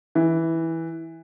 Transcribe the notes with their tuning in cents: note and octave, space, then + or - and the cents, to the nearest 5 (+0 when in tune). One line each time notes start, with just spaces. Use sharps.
E3 -10